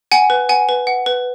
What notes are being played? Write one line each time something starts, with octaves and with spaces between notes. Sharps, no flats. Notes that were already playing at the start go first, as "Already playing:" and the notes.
F#5 G#5
B4
F#5 G#5
B4
F#5
B4